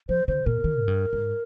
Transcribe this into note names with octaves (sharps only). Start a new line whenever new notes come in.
F3 C5
D3 C5
A#2 A#4
D#3
G#2
G2
G#2